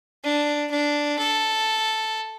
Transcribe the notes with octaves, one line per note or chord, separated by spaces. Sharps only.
D4
D4
A4